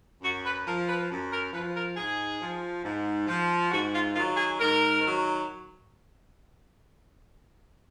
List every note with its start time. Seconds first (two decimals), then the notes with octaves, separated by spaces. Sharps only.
0.22 F#2 F#4
0.44 B4
0.66 F3 A#4
0.87 B4
1.10 F#2
1.32 A#4
1.53 F3 B4
1.75 A#4
1.97 G#2 G#4
2.41 F3
2.84 G#2
3.27 F3
3.71 G#2 F#4
3.93 F4
4.14 D#3 F#3 F4
4.36 G#4
4.59 G#2 A#4
5.01 D#3 F#3